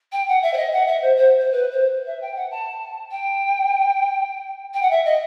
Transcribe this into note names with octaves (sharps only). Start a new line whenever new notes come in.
G5
F#5
E5
C5
D#5
F#5
E5
C5
C5
C5
B4
C5
E5
G5
F#5
A5
G5
G5
F#5
E5
D#5